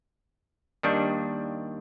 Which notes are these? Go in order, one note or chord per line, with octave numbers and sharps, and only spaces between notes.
D#2 D#3 G3 D4